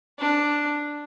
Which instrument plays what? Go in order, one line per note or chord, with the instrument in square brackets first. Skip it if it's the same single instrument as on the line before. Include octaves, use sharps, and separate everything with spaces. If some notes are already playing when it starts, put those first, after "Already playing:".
[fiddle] D4